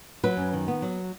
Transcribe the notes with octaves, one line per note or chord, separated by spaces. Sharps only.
F#3 B4
F#2
D#3
B3
F#3